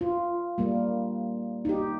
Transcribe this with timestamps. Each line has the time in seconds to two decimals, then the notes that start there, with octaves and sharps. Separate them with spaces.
0.01 F4
0.58 G3 A#3
1.65 D#4 G4